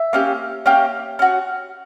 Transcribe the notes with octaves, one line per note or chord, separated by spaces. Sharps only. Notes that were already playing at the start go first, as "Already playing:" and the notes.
Already playing: E5
A#3 C#4 G4
A#3 C#4 G4
C#4 F#4